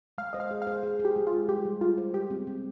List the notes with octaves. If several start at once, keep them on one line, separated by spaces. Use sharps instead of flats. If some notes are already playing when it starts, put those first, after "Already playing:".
G#3 F5
C5 D#5
F5
G#4
F5
C5
G#4
G#4
G4
G#3
F4
G#4
G3 G4
G3
G3 F4
C5
G3 G4
C4
C4